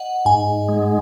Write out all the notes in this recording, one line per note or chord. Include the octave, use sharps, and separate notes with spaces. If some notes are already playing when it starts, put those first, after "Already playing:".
Already playing: D#5 F#5
G#2 G#5
G#3